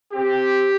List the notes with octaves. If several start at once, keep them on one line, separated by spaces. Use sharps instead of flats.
C4 G4